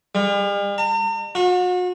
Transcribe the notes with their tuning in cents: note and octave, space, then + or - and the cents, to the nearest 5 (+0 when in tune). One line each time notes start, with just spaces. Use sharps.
G3 +45
A#5 -45
F#4 -40